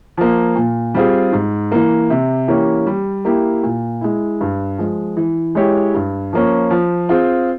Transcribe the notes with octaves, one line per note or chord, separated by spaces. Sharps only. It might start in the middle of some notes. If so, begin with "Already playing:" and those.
F3 A#3
A#2
G3 C4 F4 G#4
G#2
E3 A#3
C3
E3 A#3 C#4 G4
G3
A#3 E4 G4
A#2
G#3 E4
G2
F3 G#3
E3
G#3 E4 G4 C#5
G2
F3 A#3 C#4
F3
C4 F4 G#4